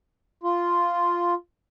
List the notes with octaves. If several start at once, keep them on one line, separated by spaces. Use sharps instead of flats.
F4